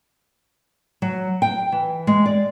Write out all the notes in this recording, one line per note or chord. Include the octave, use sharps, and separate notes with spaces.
F#3
G5
E3
G#3
D5